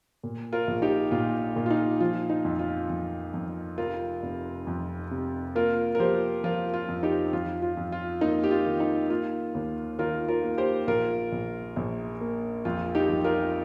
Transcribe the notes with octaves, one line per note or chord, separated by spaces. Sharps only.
A#2
F4 A#4
A#1
D#4 G4
A#2 F4
A#2
F4
D#4
F3 F4
D#4
F2
F4
F2
F2
F1 F4 A#4
F1
F2
C3
A#3 F4 A#4
A#4
F3 G4 C5
F3 F4 A#4
F4
F2
D#4 G4
F2 F4
F4
F2
F4
A#3 D#4
G4
F4
D#3
D#4
A#3 F4
D#2
D#3 F4 A#4
F4 A#4
A#3
G4 C5
A#1 F4 A#4
A#1
A#1
A#3
F2 F4
D#4 G4
F2
F4 A#4